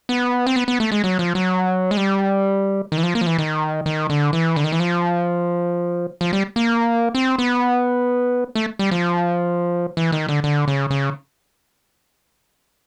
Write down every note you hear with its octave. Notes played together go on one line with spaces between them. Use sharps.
B3
C4
B3
B3
A3
G#3
F#3
F3
F#3
G#3
G3
D#3
E3
F3
A#3
F3
E3
D#3
D#3
D3
E3
D3
D#3
E3
F3
F3
G3
A#3
C4
B3
A3
G3
F3
E3
D#3
D3
D3
C#3
C#3